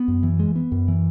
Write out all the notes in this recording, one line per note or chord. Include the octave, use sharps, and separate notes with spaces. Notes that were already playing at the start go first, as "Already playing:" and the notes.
Already playing: B3
F#2
E3
G#3
B3
F#2
E3